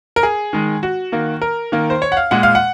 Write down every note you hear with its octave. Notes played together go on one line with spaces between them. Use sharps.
A#4
G#4
D#3 G#3
F#4
D#3 A#3
A#4
D#3 A#3
C5
C#5
F#5
F5
A#2 G#3 F#5
F5
F#5